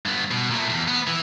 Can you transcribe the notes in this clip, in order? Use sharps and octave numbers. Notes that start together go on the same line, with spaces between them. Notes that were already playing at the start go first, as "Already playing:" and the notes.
G2 B3
B2
A#2 A3
E2
B3
E3